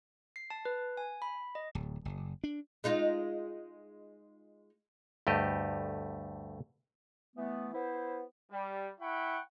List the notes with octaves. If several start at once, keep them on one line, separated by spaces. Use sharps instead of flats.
C7
A5
B4
G#5
B5
D#5
D1
F#1
D4
G#3 D#4 F4
D2 G2 A3 G4 D#5
E3 A3 B3
B3 E4 C5
G3
E4 F#5 G5 B5 C#6